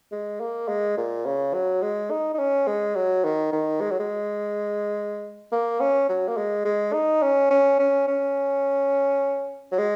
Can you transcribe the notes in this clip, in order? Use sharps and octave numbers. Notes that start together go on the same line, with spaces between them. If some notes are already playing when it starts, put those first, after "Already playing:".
G#3
A#3
G#3
A#2
C#3
F#3
G#3
D#4
D#4
C#4
G#3
F#3
D#3
D#3
G#3
F#3
G#3
A#3
C#4
F#3
A#3
G#3
G#3
D#4
C#4
C#4
C#4
C#4
F#3
G#3